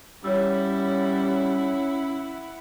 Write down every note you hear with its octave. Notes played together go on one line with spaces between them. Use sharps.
G3 C#4 E4 C#5 F#5 E6